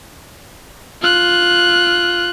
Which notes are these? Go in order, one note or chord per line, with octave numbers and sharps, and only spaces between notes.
F4 F#6